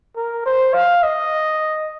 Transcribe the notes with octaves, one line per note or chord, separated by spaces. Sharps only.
A#4
C5
F5
D#5